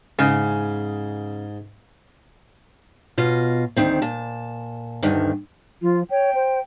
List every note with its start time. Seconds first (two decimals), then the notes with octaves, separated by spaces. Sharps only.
0.19 G#2 C#3
3.18 B2 F4 D#5
3.76 D2 D#3 C4
4.02 A#2 A5
5.03 D2 G2 D3 D#3
5.82 F3 F4
6.11 C#5 G5
6.35 C5